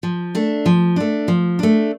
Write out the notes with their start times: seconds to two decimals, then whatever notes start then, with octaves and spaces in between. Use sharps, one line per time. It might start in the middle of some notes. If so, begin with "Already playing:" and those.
0.03 F3
0.35 A3 D4
0.66 F3
0.96 A3 D4
1.28 F3
1.59 A3 D4